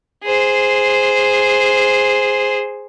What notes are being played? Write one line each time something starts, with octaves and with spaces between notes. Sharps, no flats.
G#4 C5